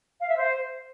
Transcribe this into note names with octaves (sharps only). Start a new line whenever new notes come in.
F5
E5
C5